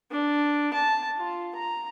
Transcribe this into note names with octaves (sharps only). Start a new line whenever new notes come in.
D4
A5
F4
A#5